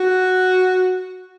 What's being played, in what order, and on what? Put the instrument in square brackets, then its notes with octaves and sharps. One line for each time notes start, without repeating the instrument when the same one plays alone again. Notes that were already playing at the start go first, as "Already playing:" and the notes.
Already playing: [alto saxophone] F#4